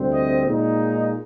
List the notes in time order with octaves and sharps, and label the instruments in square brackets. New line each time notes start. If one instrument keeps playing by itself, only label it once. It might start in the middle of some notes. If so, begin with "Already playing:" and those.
Already playing: [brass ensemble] D2 C3 G3 C4
D#5
A#2 G#3 D#4